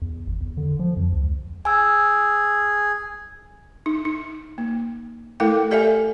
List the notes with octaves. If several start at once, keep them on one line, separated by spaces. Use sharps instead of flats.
E2
G#1
E2
D3
F3
F2
C#2
G#4 G#5 E6
D#4
D#4
A#3
A3 E4 A4 A#4 F5 G5
G4 A4 D5 E5 F5 G#5